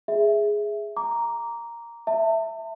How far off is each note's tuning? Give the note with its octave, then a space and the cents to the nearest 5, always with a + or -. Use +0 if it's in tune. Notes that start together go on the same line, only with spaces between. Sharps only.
G#4 +0 E5 +0
A#5 +0 D6 -15
E5 +0 A5 +40